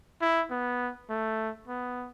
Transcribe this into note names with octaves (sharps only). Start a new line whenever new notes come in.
E4
B3
A3
B3